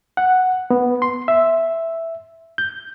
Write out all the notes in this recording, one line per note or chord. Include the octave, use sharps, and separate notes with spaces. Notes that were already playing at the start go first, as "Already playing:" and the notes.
F#5
B3
C6
E5
G6